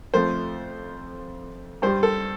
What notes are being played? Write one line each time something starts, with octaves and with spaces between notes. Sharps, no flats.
F2 F3 A3 C5
G2 G3 C5
A4